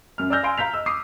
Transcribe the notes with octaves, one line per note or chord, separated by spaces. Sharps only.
F#2 F6
D5 G#5 E6 F6 G6 A#6
F5 G#5 C6 D7
F5 A#5 G6 B6 F7
D#5 E6
D6 D#6 C7